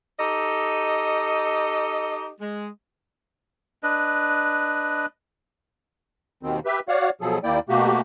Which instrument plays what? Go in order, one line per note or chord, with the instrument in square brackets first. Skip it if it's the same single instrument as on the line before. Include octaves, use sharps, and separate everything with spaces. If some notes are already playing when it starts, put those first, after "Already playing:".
[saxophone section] D#4 G4 A4 D#5
G#3
[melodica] D4 B4 D#5
[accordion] D#2 B2 D#3 C4
G4 B4 E5
F#4 C#5 D5 F5 F#5
B2 F3 F#3 G#4 A4
D#2 A#3 E4 D5 G5
B2 A3 A#3 F#4 G4